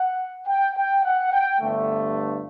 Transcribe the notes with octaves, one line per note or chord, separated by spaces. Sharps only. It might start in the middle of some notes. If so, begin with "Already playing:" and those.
Already playing: F#5
G5
G5
F#5
G5
G1 G2 D3 A3